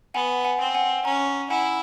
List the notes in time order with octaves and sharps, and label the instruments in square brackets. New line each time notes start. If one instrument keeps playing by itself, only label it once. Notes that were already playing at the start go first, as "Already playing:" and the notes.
[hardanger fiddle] B3 [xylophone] F#5 G#5
[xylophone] F#5 G#5
[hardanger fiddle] C4
[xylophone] F#5 G#5
[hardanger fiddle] C#4 [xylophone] G#5 A#5
[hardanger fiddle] E4 [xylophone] F#5 G#5